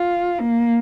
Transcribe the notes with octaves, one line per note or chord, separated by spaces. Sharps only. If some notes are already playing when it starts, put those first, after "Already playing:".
Already playing: F4
A#3